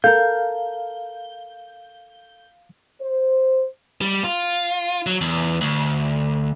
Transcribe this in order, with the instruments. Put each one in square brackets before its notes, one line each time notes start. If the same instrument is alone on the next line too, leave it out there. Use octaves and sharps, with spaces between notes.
[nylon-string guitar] A4 A#4 [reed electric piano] F5 [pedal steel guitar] G6
[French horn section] C5
[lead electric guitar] G3
F4
F#3
E2
D2